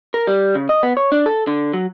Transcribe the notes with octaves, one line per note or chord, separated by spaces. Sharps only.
A#4
G3
C#3
D#5
B3
C#5
D4
A4
D3
F#3